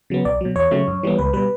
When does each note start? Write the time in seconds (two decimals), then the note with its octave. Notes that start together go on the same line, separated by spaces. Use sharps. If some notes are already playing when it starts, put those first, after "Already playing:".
0.10 C#3 F#3 B3
0.25 B1 D5
0.41 B2 F#3
0.56 E2 C#5
0.71 C#3 F#3 A3
0.88 F#2
1.03 E3 G3 B3
1.19 C#2 B4
1.33 B2 G3 B4